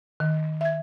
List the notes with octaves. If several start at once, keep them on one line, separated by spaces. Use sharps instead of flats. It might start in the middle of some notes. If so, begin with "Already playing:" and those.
D#3
E5 G#6